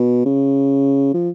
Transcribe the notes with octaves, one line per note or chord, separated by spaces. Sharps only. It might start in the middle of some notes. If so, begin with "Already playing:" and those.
Already playing: B2
C#3
F3